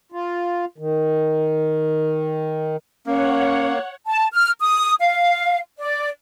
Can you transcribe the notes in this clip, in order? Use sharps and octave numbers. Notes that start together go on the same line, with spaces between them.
F4
D#3
A#3 C#4 C#5 F#5
A5
F6
D#6
F5
D5